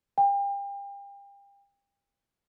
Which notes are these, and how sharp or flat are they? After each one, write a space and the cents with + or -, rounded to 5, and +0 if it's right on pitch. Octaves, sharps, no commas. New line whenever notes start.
G5 +35